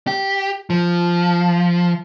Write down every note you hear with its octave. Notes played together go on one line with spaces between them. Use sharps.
G4
F3